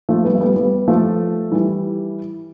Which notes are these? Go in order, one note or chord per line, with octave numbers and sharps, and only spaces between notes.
F3 A3
G3 B3
A3
G3 B3
G3 B3
F3 A3
E3 G3